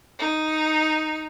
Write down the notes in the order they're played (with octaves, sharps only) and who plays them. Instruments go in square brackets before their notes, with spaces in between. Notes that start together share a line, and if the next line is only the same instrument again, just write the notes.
[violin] D#4